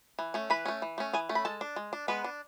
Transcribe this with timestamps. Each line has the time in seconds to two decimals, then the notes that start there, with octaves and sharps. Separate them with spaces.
0.19 E3
0.34 A3 C#4
0.50 E3 B4 B5
0.66 A3 C#4
0.82 E3
0.98 A3 C#4
1.13 E3 G#4 G#5
1.29 A3 C#4
1.35 B5
1.45 G#3 A4 A5
1.61 D4
1.76 G#3
1.93 D4
2.08 G#3 B3 B4
2.24 D4